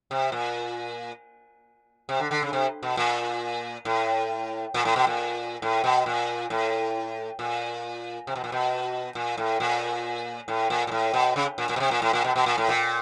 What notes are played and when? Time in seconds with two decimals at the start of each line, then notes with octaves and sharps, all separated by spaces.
0.11 C3
0.32 A#2
2.09 C3
2.20 D3
2.31 D3
2.42 C#3
2.53 C3
2.83 B2
2.97 A#2
3.85 A2
4.74 A#2
4.85 A2
4.96 B2
5.07 A#2
5.62 A2
5.84 B2
6.06 A#2
6.50 A2
7.39 A#2
8.27 C3
8.36 B2
8.44 A#2
8.52 B2
9.15 A#2
9.38 A2
9.60 A#2
10.48 A2
10.70 A#2
10.87 A#2
10.91 A2
11.14 B2
11.36 C#3
11.58 A#2
11.69 A#2
11.76 B2
11.80 C3
11.91 A#2
12.02 A2
12.13 A#2
12.24 B2
12.36 B2
12.46 A#2
12.58 A2
12.69 A#2